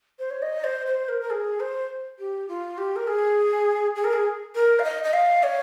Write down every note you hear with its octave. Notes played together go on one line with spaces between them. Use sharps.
C5
C#5
D#5
C5
C5
A#4
A#4
G#4
C5
G4
F4
G4
A#4
G#4
G#4
A#4
G#4
A#4
F5
D#5
D#5
F5
C#5